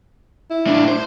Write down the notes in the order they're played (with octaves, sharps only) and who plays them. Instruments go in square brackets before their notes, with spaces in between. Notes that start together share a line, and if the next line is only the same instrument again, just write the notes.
[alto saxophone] E4
[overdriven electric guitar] A2 D4
C5